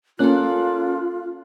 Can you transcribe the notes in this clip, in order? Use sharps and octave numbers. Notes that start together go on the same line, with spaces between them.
A#3 C#4 F4 A4 F#6